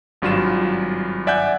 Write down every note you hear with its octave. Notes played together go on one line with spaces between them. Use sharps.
G#1 G2 F#3 F4 E7
D5 E5 F#5 G#5 F#6 G6